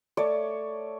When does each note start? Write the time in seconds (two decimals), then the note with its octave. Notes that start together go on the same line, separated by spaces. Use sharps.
0.17 A3 C#5 D5